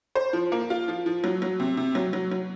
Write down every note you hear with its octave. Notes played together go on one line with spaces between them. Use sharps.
C5
F3
A#3
F4
F3
F3
F#3
F#3
C3
C3
F#3
F#3
F#3